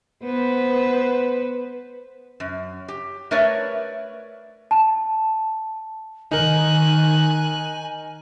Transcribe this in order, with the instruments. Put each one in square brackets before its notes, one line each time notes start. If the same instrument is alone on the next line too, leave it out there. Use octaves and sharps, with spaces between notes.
[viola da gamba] B3 B4 C5
[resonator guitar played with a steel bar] F#2
G4
A3 A#4 B4 C#5 D5 E5
[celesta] A5
[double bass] D#3 [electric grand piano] D#4 A#4 [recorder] G#5 [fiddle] F#6